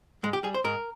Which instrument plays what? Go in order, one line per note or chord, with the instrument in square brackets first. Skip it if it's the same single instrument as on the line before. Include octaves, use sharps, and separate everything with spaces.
[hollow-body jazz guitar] G#2 G#3
G4
G3 G#4
C5
G#2 A#4